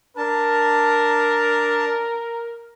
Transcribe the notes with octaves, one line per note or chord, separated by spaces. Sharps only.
D4 A#4 A5